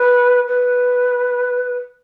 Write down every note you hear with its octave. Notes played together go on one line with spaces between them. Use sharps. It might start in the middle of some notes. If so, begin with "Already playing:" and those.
Already playing: B4
B4